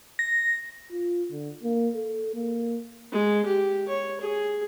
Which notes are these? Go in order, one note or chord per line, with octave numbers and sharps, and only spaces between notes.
A#6
F4
D3
A#3
A4
A#3
G#3
G4
C#5
G#4